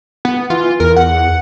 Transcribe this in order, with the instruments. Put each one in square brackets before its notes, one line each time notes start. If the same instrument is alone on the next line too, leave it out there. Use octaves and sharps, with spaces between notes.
[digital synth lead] B3
[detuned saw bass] E3 [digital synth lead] F4
[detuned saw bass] E2 [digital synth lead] A#4
[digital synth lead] F#5